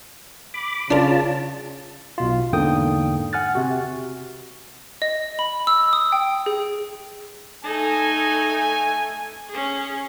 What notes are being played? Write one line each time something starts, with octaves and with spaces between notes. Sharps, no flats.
B5 D6
C#3 D4 F4 A#4 A5
B1 B2 F4
E2 G#2 D3 A#3 G5 D#6
F#5 G#5 F6 F#6 A6
C3 F#4
D#5
B5
E6
D#6
G5
G#4
A3 D#4 A4 G#5
C#4 G#4